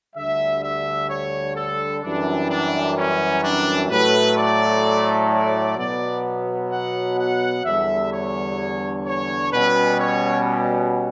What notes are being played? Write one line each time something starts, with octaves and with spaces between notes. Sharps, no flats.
D2 D3 G3 E5
E5
C#5
A4
F#2 E3 G3 D4
D4
C#4
D4
A2 F#3 A3 B4
D5
D5
B2 F#3 B3 D5
F#5
F#5
E2 D3 G3 E5
C#5
C#5
B2 G3 C#4 B4
C#5